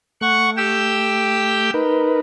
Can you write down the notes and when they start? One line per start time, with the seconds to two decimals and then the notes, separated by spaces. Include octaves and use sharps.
0.21 A3 F#5 C#6
0.57 G4 G5 E6
1.74 D#4 A#4 B4